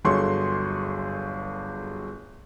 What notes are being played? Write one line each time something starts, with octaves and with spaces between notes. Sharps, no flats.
G1 F#3 G#4 A4 C6 C#6